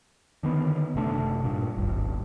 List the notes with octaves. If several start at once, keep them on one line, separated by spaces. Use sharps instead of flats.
D3 D#3 B3
F#1 C3 A3 D4
G2 A#2
D#1 G#1 G2